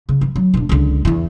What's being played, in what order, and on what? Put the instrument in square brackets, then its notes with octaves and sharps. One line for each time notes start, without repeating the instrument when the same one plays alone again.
[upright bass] C#3
E3
F#3
E1 D4
C#2 D3
E2 E3